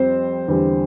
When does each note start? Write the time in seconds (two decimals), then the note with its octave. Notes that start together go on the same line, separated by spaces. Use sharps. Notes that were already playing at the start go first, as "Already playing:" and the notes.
Already playing: F2 G3 C4 C5
0.48 E2 D3 G3